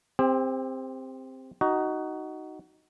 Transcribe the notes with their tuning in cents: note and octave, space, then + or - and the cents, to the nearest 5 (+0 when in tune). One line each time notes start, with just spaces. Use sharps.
C4 +0 G4 +40
D#4 +0 F#4 +20